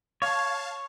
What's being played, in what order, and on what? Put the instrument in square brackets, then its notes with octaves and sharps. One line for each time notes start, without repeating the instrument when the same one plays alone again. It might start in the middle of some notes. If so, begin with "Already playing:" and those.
[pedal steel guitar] C#5 [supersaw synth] F5 A5